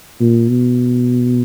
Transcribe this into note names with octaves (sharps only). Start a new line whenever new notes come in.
A#2
B2